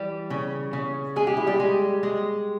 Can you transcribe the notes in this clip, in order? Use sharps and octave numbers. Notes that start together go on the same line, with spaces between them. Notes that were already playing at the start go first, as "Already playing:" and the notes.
Already playing: E3 G3
C#3
C#3
G#3 G#4
G4
E4
G3 G4
G#3
G#3